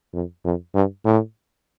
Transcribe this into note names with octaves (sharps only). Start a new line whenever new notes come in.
F2
F2
G2
A2